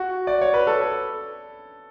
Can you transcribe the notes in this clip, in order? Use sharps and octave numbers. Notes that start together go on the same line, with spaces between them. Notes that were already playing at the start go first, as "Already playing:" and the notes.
Already playing: F#4
D5
C#5
B4
A4